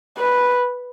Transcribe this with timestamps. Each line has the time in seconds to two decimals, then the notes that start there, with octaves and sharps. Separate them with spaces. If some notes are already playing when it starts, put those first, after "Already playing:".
0.18 B4